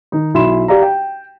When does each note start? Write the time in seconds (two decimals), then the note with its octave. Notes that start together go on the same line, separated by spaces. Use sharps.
0.12 D#3 D#4
0.34 B1 E4 B5 C6 E7
0.68 G4 D5 F5 A#5
0.83 G5